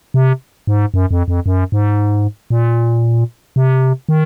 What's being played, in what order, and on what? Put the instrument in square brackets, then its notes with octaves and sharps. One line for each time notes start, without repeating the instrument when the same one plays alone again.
[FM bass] C3
G#2
F#2
F2
F2
F#2
G#2
A#2
C3
D#3